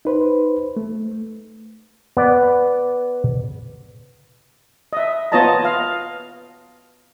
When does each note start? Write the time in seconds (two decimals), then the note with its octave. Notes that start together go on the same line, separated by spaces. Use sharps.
0.05 D#4 B4 C5
0.77 A3
2.17 B3 D5
4.93 D#5 E5
5.32 B3 F4 C#5 D#5 A5 A#5
5.65 F5